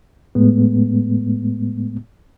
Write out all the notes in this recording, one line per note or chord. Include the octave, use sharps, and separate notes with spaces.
A2 G#3 A3 B3